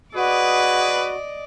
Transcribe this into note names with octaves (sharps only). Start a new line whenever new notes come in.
F#4 G#4 B4 D5 D#5